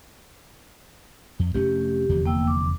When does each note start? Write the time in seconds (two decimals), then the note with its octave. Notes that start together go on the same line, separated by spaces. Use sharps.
1.39 F2
1.54 F1 A3 C#4 G4
2.09 F1 E2 D3
2.26 A#3 G5 E6
2.47 D6